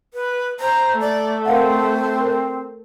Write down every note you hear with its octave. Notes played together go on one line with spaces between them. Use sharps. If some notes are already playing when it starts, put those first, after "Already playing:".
B4
C5 A#5
A3 D5
C4 A#4 F5 F#5
A#4 C5